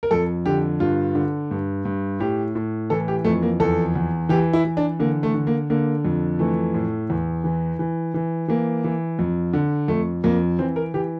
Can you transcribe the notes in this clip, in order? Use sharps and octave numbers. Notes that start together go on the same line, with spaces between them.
A#4
F2 A4
D3 G4
G2 F4
D3
G2
G2
A2 G4
A2
E3 A4
G4
F2 A3
A#3
E2 A4
E2
E3 G4
E4
E3
D4
D3 A#3
A3
D3
A#3
D3 A#3
F2
E3 A3
A2
E2
E3
E3
E3
E3 A#3
E3
F2
D3
F2 A3
F2 A#3
E3 C4
A#4
E3 G4